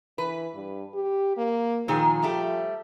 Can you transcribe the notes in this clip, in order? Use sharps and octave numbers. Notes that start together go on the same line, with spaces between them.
E3 B4
G2
G4
A#3
A#2 D#3 F3 G#4
G3 A3 G4